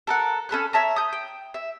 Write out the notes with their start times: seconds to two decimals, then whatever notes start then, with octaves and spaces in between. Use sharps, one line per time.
0.07 A4 A#4 F#5
0.49 C#4 A4 B5 F#6
0.73 C#5 E5 A5 A#5
0.96 D#6 G6
1.13 G5
1.54 E5